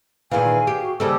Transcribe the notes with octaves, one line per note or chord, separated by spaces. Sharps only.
A#2 D#3 E3 G#4 F5 G#5
G4
F#4
D#2 C#3 G3 G4 A4 C5